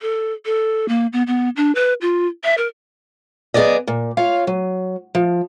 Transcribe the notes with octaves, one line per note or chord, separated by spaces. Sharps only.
A4
A4
A#3
B3
B3
D4
B4
F4
E5
A#4
F#2 B3 G#4 A4 D5 D#5
A#2
F4 C#5 F5
F#3
F3